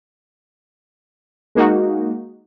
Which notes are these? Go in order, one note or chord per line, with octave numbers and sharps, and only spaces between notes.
G#3 A#3 D#4 F#4